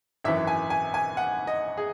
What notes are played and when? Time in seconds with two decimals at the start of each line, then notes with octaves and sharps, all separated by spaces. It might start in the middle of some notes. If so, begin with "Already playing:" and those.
0.24 G#1 F#2 E3 E5
0.47 G#5
0.70 G#5
0.94 G#5
1.17 F#5
1.47 D#5
1.77 G#4